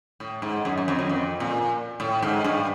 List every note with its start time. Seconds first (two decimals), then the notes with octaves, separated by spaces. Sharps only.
0.20 A2
0.42 G#2
0.65 F#2
0.78 F#2
0.88 F2
0.99 F#2
1.09 F2
1.40 A#2
2.00 A2
2.22 G#2
2.44 G2